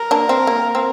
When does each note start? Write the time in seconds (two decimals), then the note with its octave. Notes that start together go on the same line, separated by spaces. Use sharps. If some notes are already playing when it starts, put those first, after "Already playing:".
Already playing: A#4
0.11 A#3 D4
0.29 C4
0.47 A#3
0.75 C4